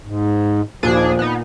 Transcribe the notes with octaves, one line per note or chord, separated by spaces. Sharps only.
G#2
D#2 A#2 F3 D4 G#4
B3 D#4